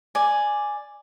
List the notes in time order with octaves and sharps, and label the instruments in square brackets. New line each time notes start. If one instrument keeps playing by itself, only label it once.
[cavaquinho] D5 G#5